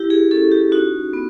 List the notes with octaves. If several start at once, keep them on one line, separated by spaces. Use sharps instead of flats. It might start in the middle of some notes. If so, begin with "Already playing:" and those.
Already playing: E4 G4
G#4
C#4 A4
G4
D#4 F#4
B3